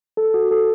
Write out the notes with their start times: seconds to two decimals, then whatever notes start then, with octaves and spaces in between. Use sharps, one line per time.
0.17 A4
0.34 F#4
0.51 A4